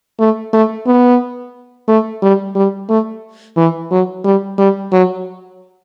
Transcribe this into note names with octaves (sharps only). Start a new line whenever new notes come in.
A3
A3
B3
A3
G3
G3
A3
E3
F#3
G3
G3
F#3